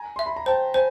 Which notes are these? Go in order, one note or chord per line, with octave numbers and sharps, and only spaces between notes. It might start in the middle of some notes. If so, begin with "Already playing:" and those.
Already playing: G#5 A#5
E5 C6
B5
A#5
C5 G5 A5
C5 G#5